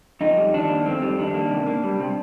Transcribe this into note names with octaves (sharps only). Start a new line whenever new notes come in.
F2 D#4
G3
D#3 D4
A#3
F2 C4
G3
D#3 D4
A#3
C3
A#3
G3
C3